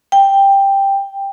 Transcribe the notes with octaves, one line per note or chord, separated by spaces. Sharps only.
G5